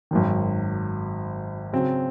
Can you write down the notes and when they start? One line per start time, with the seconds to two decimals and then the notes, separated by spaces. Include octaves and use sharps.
0.11 G#1 F#2 D#3
1.73 C#3 F#3 C4